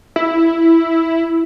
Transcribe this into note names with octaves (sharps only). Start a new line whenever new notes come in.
E4